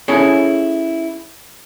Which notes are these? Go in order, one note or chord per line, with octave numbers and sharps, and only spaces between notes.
C#4 E4 G#4 A4 C#5